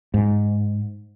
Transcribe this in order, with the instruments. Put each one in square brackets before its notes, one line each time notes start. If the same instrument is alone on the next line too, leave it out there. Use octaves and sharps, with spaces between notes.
[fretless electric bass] G#2